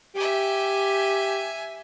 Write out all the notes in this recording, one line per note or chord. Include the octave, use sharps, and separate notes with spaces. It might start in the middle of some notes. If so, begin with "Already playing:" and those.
G4 E5 G#5